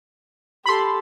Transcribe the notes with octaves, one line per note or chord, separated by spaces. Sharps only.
G4 A4 B5 C6